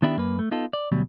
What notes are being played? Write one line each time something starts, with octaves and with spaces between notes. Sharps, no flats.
D#3 B3 D4 E4 G4
F#2 A#3 B4
A3
B3 D#4 F4 A4
D5
D2 B2 F#3 G3